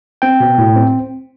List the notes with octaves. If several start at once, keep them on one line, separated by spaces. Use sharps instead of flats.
C4 G5
B2
A2
C4